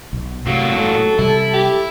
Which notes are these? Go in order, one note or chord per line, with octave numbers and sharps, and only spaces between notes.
B1
A2 C3 F#3 A#3
A3 A4
C3 G3 E4
G4